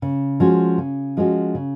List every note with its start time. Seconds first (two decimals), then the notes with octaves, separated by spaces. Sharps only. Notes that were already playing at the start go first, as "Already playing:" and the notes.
0.02 C#3
0.40 F3 G#3 C#4 F#4
0.78 C#3
1.17 F3 G#3 C#4 F#4
1.55 C#3